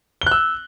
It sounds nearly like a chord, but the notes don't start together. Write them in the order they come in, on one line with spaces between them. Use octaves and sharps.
G7 F#6 E6